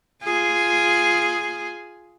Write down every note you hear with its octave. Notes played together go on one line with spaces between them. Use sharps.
F4 G#4